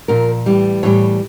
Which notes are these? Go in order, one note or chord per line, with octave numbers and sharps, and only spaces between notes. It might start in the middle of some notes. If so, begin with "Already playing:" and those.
A#2 F3 A#4
A2 E3 G3
A2 E3 G3 C#5